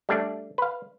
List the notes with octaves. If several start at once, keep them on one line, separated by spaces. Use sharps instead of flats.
G3 A3 D4 D5
B4 F5